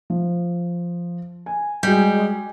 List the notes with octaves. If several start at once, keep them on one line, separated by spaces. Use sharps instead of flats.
F3
G#5
G3 G#3 F#4 G5 G#5 G6